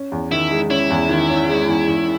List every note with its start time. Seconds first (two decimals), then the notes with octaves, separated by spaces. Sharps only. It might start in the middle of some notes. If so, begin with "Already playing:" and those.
Already playing: C#4
0.12 E2
0.32 D#3 E4
0.51 G#3
0.70 C#4 E4
0.90 E2
1.09 D#3
1.30 C#4
1.49 G#3
1.69 E2
1.88 E2